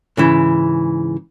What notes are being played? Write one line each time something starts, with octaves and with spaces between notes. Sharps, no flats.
G#2 C#3 E3